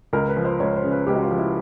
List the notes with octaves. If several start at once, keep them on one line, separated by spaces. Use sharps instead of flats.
C#2 A#4
B4
F3
C5
C#2 C#5
C5
C#3
B4
C#2 G4
F#4
F4
F3
E4